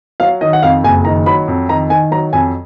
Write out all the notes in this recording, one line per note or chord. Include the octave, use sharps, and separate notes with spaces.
F#3 F5
D#3 D#5
F#5
F2 F5
F#1 G#5
D#3 A#5
F#3 B5
F2
D#3 A#5
D#3 G#5
F#3 A#5
F2 G#5